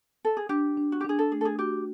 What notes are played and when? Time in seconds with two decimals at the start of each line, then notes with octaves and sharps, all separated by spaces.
0.25 A4
0.37 G#4
0.49 D4 G4
0.77 D4
0.92 F#4
1.01 G4
1.05 D4 G#4
1.19 A4
1.32 A3 G#4
1.41 A4
1.45 G#4
1.59 F#4 G4